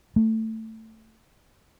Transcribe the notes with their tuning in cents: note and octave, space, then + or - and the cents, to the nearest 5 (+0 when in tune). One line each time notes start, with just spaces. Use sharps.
A3 +15